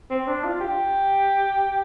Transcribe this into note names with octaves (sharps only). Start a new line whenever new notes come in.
C4
D4
F4
G4